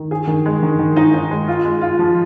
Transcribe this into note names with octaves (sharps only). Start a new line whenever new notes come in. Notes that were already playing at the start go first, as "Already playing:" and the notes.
Already playing: D#3
G#4
D#3
G#3
D#3
D#3
D#4
D#4
G#3
F4
G#3
F4
F3